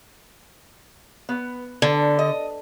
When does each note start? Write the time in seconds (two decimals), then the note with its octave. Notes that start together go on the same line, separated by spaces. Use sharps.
1.29 B3
1.82 D3 B3 D4
2.19 D#5